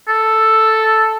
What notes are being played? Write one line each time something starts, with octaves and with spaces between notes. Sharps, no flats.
A4